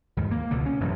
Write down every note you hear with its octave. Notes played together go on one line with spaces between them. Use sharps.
D#2 G#2
A#3
C#2 B2 D3 A#3
C#4
A1 F#2 C3